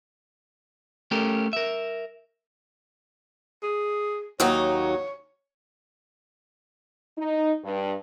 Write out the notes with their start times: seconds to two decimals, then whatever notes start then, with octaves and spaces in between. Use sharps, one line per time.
1.11 A3 C#4 G4 A4 A#4
1.53 A#4 E5
3.63 G#4
4.40 D#2 F#3 D#4 C#5
7.18 D#4
7.64 G2